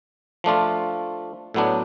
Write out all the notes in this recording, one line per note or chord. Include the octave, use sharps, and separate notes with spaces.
F3 A3 D4 F4
A2 F#3 B3 D4